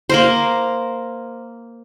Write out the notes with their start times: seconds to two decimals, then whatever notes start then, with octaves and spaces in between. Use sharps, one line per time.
0.09 A#3 A#4 C5